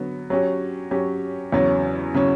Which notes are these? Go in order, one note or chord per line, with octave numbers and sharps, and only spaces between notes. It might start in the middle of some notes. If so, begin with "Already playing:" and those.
Already playing: D3 F#3 B3
F#3 C#4 G4
F#3 C#4 G4
E2 C#3 F#3 C#4
C#3 F#3 C#4